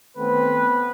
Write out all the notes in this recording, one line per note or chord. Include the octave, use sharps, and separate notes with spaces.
D#3 A3 B3 C4 B4